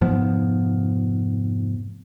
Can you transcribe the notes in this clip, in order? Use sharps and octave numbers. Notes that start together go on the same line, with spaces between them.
F1 G#2 F3 B3